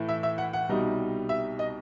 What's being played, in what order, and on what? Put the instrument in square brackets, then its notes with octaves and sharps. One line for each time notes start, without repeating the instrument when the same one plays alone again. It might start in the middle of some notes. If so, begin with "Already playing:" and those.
Already playing: [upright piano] A2 E3 A3 E4
E5
E5
F#5
F#5
C2 B2 G3 D#4
E5
D#5